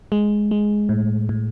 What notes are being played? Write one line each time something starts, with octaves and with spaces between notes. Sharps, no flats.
G#3
G#3
A2
A2